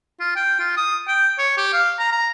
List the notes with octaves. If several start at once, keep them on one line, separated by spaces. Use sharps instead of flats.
F4
G5
F4
D#6
G5
C#5
G4
F5
A#5
A#5